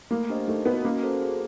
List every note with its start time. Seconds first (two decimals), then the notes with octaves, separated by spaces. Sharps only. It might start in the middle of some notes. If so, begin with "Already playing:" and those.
0.11 A3 A#3
0.29 D4 G4 C5 D#5
0.48 A3 D#4
0.65 B3 F#4 A#4 D#5
0.85 A#3 C#4
1.03 F#4 A4 C5
1.21 G#4